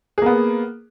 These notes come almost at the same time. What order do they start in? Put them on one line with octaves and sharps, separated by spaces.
G#4 A#3 B3